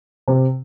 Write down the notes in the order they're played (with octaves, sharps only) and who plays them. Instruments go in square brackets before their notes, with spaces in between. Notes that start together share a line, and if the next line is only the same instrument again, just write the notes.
[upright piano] C3